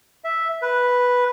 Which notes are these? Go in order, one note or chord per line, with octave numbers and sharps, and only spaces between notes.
E5
B4